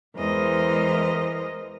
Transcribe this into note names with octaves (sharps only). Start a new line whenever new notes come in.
E2 E3 G#3 A#4 C5 D#5